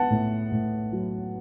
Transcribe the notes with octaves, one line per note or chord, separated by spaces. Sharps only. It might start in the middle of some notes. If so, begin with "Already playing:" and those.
Already playing: B3 F#5 A5
A2
A2
F#3